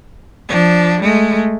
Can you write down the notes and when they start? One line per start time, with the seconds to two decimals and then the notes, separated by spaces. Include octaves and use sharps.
0.49 F3 D4
1.02 G#3 A3